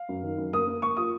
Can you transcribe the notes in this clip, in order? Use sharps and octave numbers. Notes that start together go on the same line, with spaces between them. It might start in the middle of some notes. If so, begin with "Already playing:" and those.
Already playing: F5
F#2
D#3
F#2
A#3 D#6
A#3
A#3 C#6
F4 D#6